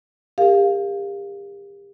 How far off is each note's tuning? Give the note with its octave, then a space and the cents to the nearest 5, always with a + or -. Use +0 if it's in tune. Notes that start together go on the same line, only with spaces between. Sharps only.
G4 +35 A#4 -10 F5 +0